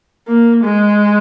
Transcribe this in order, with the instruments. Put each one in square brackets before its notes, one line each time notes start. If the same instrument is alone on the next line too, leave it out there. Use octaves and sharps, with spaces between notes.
[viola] A#3
G#3